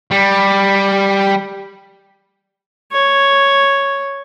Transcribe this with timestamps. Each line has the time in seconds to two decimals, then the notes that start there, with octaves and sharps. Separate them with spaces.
0.11 G3
2.92 C#5